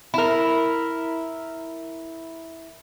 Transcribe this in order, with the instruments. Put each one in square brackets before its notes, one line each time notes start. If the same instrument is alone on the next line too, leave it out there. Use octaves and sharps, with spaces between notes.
[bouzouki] E4 A#4